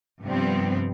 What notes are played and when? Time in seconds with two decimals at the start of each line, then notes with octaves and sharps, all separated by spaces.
0.23 G2 C3 F3 G3 B3 C4